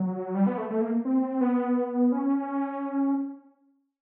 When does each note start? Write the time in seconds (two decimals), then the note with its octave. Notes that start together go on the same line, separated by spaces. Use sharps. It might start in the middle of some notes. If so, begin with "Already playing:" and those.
Already playing: F#3
0.35 G3
0.47 B3
0.58 A3
0.71 A3
0.81 A#3
1.05 C4
1.41 B3
2.12 C#4